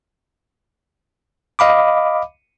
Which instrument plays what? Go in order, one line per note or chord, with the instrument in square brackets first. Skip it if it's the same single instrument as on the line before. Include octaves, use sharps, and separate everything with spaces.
[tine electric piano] D#5 F5 B5 D6